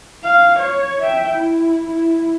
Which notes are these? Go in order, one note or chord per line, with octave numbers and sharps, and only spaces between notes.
F5
C#5
E5 G5
E4
E4